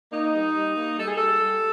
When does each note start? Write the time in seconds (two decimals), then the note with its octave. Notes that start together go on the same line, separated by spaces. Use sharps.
0.12 A#3 D#4
0.34 G3
0.55 G3
0.77 A#3
0.98 G3 A4
1.07 G#4
1.17 G3 A4
1.41 G3